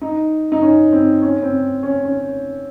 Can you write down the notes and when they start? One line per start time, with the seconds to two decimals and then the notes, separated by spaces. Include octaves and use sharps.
0.01 D#4
0.52 D#4
0.62 C#4
0.93 C4
1.22 C#4
1.42 C4
1.83 C#4
2.04 C#4